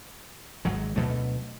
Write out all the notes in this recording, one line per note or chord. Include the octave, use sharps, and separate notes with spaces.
G#1 F#3 G#3
D2 B2 F#3 A3